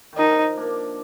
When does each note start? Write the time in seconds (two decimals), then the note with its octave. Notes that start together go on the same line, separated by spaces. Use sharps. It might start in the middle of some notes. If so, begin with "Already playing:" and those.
0.13 D#3
0.18 F3 D#4
0.57 A#3 D4